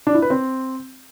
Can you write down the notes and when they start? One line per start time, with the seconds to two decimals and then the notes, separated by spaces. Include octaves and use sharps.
0.07 D4
0.15 E4
0.22 B4
0.30 C4